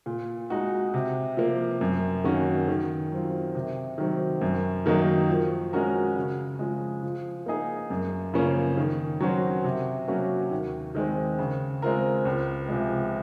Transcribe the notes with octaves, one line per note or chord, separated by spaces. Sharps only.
A#2
G#3 D#4 F#4
C3
F3 A#3
F#2
D#3 A#3 C#4 F#4
D#3
F#3 C4 F4
C3
D#3 F#3 C4
F#2
D#3 F#3 A#3 D#4
F3
G#3 C#4 F#4 A#4
C#3
F3 G#3
F3
A#3 D#4 G#4
F#2
C#3 F3 A#3 C#4
D#3
F#3 C#4 F#4 C5
C3
F#3 A#3 C#4 F#4
D#2
D#3 G#3 C4
C#3
G#3 C4 F4 A#4
C#2
C3 F3 G#3